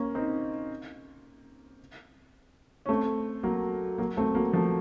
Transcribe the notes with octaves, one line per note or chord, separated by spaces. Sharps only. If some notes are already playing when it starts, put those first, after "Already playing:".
Already playing: A#3 C#4
C4 D#4
C#4
A3 C4
F#3 A#3
F#3 A#3
A3 C4
F#3 A#3
F3 A3